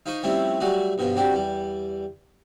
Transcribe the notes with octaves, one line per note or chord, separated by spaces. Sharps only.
D#4 F4 C5 B5 C#6 D#6
F3 G3 A3 C4 C#4 E4
F#3 G3 A3 F#4 G#4
G2 B2 F3 B3
C4 D4 F#4 G4
E2 G3